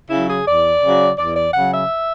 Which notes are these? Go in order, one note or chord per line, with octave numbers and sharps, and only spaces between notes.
C#3 F#3 E4
G#4
E2 D5
C#3
F#3
E2 D5
D5
C#3 F#3 F#5
E5